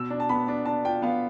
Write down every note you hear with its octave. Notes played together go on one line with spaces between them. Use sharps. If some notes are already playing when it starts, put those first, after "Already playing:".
Already playing: B2 E6
D4
A5
B3 B5
D4
D4 A5
F4 G5
B3 F5